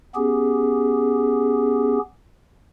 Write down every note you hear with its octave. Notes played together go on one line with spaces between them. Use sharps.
B3 C#4 G4 G#4